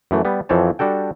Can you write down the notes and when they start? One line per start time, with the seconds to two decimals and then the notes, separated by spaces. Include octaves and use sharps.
0.11 F#2 E3 A3
0.25 G3 B3
0.49 F2 E3 F3 C4 C#5 A5
0.79 G3 D4 F#4 A4 G5